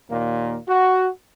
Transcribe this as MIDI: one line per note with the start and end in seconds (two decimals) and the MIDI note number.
0.10 0.56 39
0.10 0.56 46
0.10 0.56 58
0.67 1.08 66